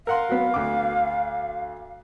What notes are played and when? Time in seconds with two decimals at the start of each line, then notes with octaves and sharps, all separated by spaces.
0.07 A#4 F5 F#5 C6
0.29 F#3 B3
0.54 D2 D6